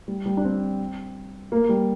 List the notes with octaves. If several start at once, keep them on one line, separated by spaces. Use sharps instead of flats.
G3
G3
D4
C4
A#3
G3